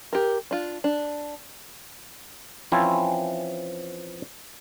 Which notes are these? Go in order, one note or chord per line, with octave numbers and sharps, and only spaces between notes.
G4 A#4
D4 F4
D4
E3 F3 C4 C#4 E4